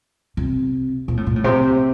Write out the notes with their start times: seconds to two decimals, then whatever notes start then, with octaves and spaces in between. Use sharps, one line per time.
0.37 C3
1.08 A#2
1.17 A2
1.27 A#2
1.36 A2
1.44 C3